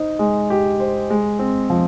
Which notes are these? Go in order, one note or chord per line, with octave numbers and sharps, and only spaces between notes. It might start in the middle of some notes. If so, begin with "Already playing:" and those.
Already playing: D#4 C5
G#3
G4
C5
G#3
C4
F3